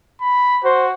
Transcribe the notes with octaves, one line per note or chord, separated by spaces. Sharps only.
B5
F#4 C5